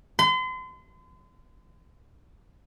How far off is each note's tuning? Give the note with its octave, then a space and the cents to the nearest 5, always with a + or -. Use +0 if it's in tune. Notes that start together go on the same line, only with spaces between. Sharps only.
C6 -40